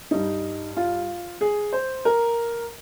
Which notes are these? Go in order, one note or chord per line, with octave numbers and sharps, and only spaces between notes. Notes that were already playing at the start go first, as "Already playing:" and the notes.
G2 G3 D#4
F4
G#4
C5
A#4